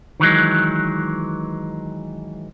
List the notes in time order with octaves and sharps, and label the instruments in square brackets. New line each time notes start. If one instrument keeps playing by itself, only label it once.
[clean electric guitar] D#3 E3 F#3 G#3